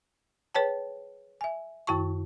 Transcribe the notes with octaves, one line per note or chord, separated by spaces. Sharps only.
G#4 B4 C#5 G5 A5
E5 G#5
F#2 D#3 E4 F#4 A5 C#6